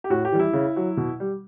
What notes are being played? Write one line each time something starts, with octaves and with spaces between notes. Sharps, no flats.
G4
A2 F#4
G4
E3 G3
E4
C#3
F#3
B2
G3